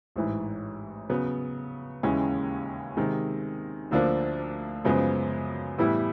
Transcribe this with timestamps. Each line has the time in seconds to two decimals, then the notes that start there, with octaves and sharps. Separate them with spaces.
0.16 A1 G#2 E3
1.10 C#3 F#3 B3
2.03 D#2 C#3 E3 G#3 C#4
2.97 C3 D#3 G#3
3.91 D2 D3 F3 A#3 D4
4.85 F#2 C#3 F3 G#3 B3
5.78 A2 E3 G3 B3 E4